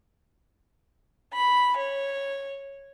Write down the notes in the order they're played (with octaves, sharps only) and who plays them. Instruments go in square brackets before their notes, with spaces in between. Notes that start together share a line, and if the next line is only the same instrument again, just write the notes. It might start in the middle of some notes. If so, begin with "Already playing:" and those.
[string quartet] B5
C#5